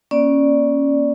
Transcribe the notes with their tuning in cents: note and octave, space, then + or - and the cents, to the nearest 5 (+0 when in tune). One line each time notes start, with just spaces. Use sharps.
A#3 +35 C#4 +0 D5 +0